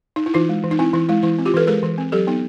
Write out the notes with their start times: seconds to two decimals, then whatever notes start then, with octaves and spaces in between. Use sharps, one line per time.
0.16 D#4
0.26 E4
0.34 E3 D#4 F4
0.49 G#3
0.64 E3
0.71 D#4
0.79 C4 E4
0.94 E3 E4
1.09 G#3 E4
1.23 E3 E4
1.38 C4
1.45 F4 G4
1.54 E3 A4 B4
1.67 G#3 G#4 A#4
1.83 E3
1.98 C4
2.12 F#3 G4 A4
2.27 B3 D#4